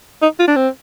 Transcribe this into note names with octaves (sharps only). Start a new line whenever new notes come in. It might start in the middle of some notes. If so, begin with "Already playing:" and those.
D#4
F4
D4
C4